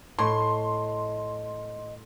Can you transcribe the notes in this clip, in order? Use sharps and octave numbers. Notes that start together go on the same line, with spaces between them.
A2 D#5 C6